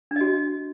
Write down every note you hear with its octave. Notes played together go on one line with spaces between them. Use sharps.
D4 F#4 D#5